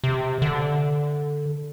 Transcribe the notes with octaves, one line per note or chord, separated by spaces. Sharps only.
C3
D3